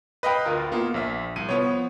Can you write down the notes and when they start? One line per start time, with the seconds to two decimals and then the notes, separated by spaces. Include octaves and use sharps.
0.23 B4 D#5 F5 G5 B5
0.45 D2 F4 A#4
0.72 A#3 B3 F4
0.94 A#1 E5
1.36 C2 D#7
1.49 F3 B3 C#5